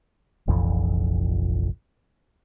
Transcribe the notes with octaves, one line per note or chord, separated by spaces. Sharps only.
F1 A#1 F2 E3